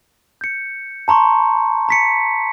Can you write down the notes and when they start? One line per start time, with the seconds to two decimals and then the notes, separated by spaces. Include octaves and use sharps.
0.41 G6 C#7
1.08 A5 A#5 C6 C#6
1.89 A#5 B6 C#7